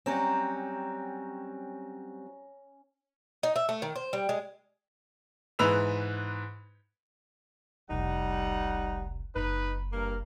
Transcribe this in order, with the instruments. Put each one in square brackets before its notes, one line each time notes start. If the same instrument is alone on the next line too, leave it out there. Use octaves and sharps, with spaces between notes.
[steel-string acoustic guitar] F#3 G3 C4 [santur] C#4 A#5
[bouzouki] D#4
E5
A3
D#3
C5
G3
G#3
[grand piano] G#2 E3 B4 E6 F7
[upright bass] F1 C2 [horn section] G3 D#4 F#5
[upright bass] F#1 [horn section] D#4 B4
[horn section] G2 A#3 A#4